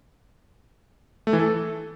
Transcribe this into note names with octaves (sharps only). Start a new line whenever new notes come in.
A3
E3
A4